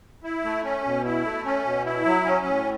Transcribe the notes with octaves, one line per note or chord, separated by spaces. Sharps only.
E4
A3
C#4
B2
E4
A3
C#4
B2
E4
F#3
C#4
A2